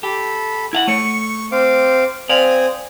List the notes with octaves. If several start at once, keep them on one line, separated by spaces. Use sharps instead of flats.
G4 A4 B5
E4 F5 F#5
A3 C#5 C#6
C4 F5 D6
C4 D5 F5 G#5 D#6